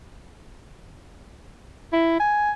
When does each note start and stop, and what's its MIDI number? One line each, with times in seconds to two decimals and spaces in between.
1.93 2.15 64
2.20 2.51 80